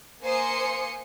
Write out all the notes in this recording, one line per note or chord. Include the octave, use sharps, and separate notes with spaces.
A#3 C5 G#5 C6 D#6 C#7